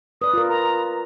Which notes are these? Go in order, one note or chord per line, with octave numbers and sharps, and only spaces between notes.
B4 D5 D#6
F4 A#4
A#5